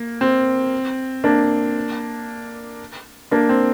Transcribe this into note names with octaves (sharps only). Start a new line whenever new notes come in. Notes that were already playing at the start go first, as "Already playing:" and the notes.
Already playing: A#3
C4
A#3 D4
A#3 D4
C4